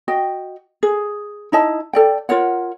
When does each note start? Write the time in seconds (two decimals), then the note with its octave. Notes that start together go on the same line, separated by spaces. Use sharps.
0.08 F#4 D#5 G5
0.83 G#4
1.52 D#4 E4 D#5 A5
1.93 A4 D5 G5
2.29 F4 A#4 C#5 F#5